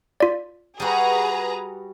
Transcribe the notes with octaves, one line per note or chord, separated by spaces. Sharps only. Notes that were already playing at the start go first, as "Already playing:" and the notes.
F4 D5
G3 F#4 G#4 B4 A#5